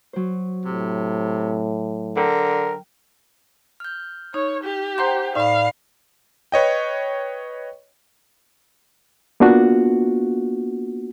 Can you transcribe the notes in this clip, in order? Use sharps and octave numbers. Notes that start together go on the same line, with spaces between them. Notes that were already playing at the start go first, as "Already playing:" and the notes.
F#3 C5
A2 C3
D3 A#4 G5
F6 G6
D#4 C#5
G4
C5 F#5 G5 A#5 C6 G6
A2 D#4 D5 F5 B5
B4 C#5 D#5 G5
A#3 B3 D4 F4 F#4